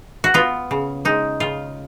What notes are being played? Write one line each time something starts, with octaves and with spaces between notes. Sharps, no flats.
F#4
B3 F4
C#3
G#3 D#4
C#3 F4